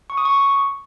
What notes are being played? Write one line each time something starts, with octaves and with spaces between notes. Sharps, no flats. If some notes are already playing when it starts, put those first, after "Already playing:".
C#6
D#6
C#6